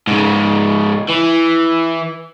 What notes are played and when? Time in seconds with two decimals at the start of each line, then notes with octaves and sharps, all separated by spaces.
0.07 G#2 C#3
1.10 E3